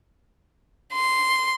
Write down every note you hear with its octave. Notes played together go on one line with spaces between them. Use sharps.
C6